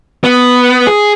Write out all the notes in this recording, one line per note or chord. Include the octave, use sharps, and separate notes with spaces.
B3
G#4